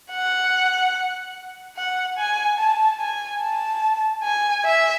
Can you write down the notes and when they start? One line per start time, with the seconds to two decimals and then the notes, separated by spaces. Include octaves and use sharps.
0.12 F#5
1.77 F#5
2.18 G#5
2.59 A5
3.00 G#5
3.42 A5
4.24 G#5
4.65 E5